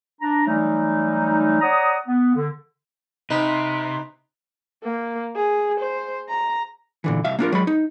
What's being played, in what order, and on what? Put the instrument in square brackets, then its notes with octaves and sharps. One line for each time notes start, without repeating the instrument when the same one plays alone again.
[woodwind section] D4 A#5
E3 F#3 G3 A3 D#4
C#5 D5 F#5 A#5 D#6
B3
D3
[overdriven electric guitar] C3 [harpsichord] D#4 B4
[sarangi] A#3
G#4
C5
A#5
[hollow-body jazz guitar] A#2 D3 E3
C2 E5 F5
A#3 D4 F4 A#4
F#3 G#3 B5
D#4